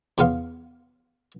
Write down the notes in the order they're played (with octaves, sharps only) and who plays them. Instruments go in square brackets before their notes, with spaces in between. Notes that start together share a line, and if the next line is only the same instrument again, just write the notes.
[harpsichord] E2 C#3 B3 F5 C6